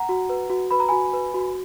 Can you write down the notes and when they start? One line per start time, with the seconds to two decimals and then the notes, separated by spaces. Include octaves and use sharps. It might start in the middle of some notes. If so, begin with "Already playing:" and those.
Already playing: F#5 A#5
0.09 F#4
0.29 B4
0.50 F#4
0.71 B4 B5
0.80 A#5
0.88 F#4 G#5 B5
1.13 B4
1.34 F#4